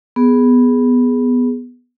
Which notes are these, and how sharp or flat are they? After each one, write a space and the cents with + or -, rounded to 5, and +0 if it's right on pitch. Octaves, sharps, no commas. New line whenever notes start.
B3 +0 G#4 +0